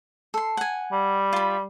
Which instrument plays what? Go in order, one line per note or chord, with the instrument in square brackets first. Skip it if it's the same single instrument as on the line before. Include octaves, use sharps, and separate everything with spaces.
[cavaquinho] A4 C6
F#5 G#5
[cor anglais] G3
[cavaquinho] F4 B5